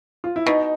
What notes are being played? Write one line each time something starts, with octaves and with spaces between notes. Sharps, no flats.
F4
E4
B2 D#4